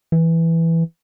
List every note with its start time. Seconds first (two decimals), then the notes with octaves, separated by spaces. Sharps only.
0.12 E3